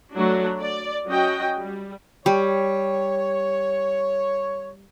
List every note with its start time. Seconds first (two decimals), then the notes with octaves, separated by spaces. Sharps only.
0.13 F#3 A3 D4 F#4
0.61 D5
1.07 F#3 C#4 F#4 D#5 G5
1.58 G3
2.26 G3 C#5